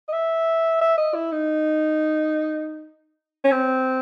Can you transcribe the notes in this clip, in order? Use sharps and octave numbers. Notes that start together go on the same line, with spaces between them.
D#5
E5
E5
D#5
E4
D#4
C#4
C4